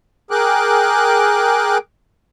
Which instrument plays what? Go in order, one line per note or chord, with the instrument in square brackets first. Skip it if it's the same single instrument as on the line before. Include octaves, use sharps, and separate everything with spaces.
[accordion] G#4 A#4 G5 D6 F#6